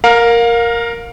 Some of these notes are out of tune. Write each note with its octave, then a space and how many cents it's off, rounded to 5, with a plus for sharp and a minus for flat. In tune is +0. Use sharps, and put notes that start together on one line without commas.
A#4 +0 F5 +25